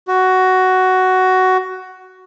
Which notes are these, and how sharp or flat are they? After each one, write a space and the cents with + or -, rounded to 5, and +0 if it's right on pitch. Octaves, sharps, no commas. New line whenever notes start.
F#4 +10